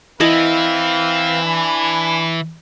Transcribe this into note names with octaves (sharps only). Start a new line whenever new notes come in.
E3 C4 E4 B4 D#5 F5 A5
D4 G#5 B5